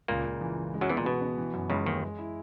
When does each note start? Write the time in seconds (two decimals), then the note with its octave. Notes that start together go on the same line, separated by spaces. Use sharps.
0.08 C#2 A#2 A#3
0.26 C#2
0.41 E3
0.57 E3
0.74 G#3
0.81 F#2 F#3
0.89 E2 E3 B3
0.97 A#2
1.05 B2 B3
1.22 B3
1.38 E3
1.54 F#2
1.70 C#2 F#2 C#3
1.86 D#2 D#3 G#3
2.02 G#3
2.19 E4